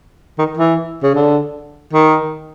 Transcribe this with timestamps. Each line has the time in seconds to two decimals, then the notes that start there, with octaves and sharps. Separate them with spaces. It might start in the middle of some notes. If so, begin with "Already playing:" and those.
0.38 D#3
0.57 E3
1.03 C#3
1.15 D3
1.93 D#3